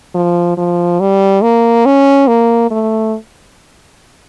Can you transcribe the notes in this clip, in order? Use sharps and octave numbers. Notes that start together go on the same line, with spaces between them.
F3
F3
G3
A#3
C#4
A#3
A3